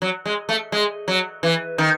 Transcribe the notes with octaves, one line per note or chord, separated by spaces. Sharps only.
F#3
G#3
A3
G#3
F#3
E3
D#3